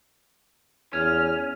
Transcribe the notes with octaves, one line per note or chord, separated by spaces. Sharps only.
E2 C#4 F6